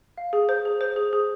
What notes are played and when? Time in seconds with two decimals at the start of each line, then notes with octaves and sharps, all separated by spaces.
0.18 F5
0.33 G#4
0.49 C5
0.65 G#4
0.81 C5
0.96 G#4
1.13 G#4